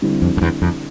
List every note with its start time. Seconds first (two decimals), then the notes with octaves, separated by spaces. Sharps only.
0.02 D3 G3 C4 E4
0.22 F2
0.37 F2
0.42 E2
0.62 F2